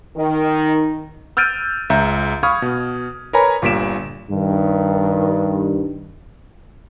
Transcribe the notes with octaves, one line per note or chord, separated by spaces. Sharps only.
D#3
E6 F6 G6 A6 D7 D#7
C#2 E5 A#5 G6
F5 B5 C#6 D#6 F6 G#6
B2
A#4 B4 C#5 G#5 A#5 B5
G1 A#2 G3 B6 D7 E7
G2 D#3